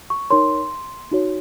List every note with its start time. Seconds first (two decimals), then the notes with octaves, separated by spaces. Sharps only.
0.10 C#6
0.30 D#4 A#4 C#5 C6
1.11 D#4 F#4 C#5